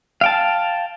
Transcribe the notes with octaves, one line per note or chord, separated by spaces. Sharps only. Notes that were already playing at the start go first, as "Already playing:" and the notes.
F5 G5 A5